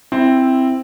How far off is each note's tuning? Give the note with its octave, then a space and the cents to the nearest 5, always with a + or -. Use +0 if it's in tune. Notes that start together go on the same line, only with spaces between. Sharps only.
C4 +0 E4 +0